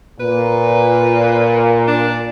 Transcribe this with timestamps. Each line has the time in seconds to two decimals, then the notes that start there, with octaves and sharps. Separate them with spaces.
0.20 A#2 B4
1.88 D4